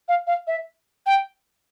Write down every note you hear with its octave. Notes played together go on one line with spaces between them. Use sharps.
F5
F5
E5
G5